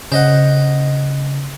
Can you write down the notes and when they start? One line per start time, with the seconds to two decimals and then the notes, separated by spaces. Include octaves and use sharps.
0.12 C#3 C5 D#5 F#5